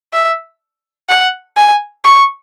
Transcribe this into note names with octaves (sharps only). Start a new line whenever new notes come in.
E5
F#5
G#5
C#6